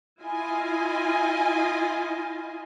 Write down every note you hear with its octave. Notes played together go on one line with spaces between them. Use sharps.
E4 F4 D#5 G#5